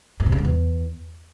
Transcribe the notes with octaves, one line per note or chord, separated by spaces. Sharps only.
G2
C3
C#3
G#2
E2